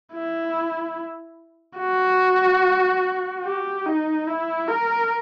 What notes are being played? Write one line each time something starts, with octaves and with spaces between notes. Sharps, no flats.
E4
F#4
G4
D#4
E4
A#4